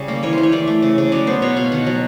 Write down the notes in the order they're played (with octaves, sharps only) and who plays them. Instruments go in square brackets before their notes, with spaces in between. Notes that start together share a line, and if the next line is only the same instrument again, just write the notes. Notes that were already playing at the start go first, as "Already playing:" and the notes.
Already playing: [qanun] C#3 G3
A#3
E3 C#5
E3 C5
C#5
E3 D5
A3
C#3
C#3
F#3 D5
B3 C5
B2 C#5
B2 F5
D#3 F#5
F#3